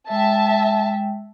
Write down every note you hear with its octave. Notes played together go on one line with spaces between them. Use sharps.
G#3 E5 G5 A5